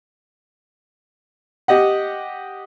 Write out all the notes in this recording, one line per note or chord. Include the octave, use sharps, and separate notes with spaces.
G4 D#5 F#5